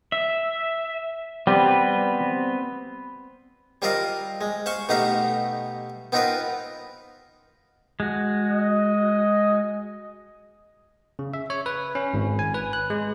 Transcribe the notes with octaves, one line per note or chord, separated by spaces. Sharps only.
E5
G3 B3 C4 B4
G3 C4 F4 A#4 D#5 F5
G#3
C5 F5 C6 C#6
B2 A3 D#4 G4 F5 A#5
B3 C4 D#4 F4 A#4 B4
G#3 F#4
D#5
C#3
E5
C#5
B4
C#4
G#1
G#5
B4
F#6
G#3